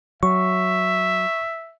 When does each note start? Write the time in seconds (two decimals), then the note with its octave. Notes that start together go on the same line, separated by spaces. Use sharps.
0.23 F#3 E5 C#6